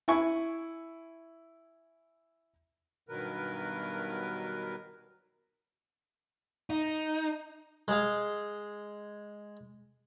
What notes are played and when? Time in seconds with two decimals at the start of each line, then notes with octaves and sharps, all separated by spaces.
0.08 E4 G#5 C#6
3.09 G2 B2 D#3 F#3 A#4 B4
6.70 D#4
7.88 G#3 G#4 F5